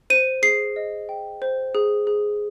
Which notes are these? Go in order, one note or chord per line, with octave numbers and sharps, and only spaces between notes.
C5 D#7
G#4 C7
D#5
G5
C5
G#4
G#4